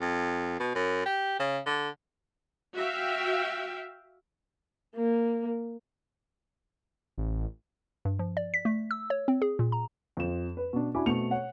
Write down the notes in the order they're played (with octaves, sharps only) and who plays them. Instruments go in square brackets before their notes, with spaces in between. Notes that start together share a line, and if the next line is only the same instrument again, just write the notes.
[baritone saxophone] F2
B2
F#2
G4
C#3
D3
[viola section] F#4 E5 F5 G5
[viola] A#3
[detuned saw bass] A1
[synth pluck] G2
F3
D5
B6
A3
E6
C#5
C4
G#4
A#2
A#5
[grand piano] F2 F3 E7
B4
B2 D4
D4 E4 F#4 G#5 B5 D6
B2 A3 C4 C#7 F7
C#5 F#5